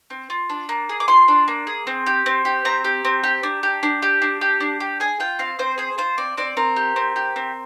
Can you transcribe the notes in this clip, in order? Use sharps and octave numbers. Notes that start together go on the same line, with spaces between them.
C4
F4
D4
A#3
G#4
D6
F4 C6
D4
A#3
G#4
C4
G4
C4
G4
C4 A#5
G4
C4
G4
D4
G4
D4
G4
D4
G4
D4
G4
G#4 G#5
F4 G5
C4 F5
C4 C5
G#4 C5
F4 C5
C4 D5
C4 D5
C4 A#4
G4
C4
G4
C4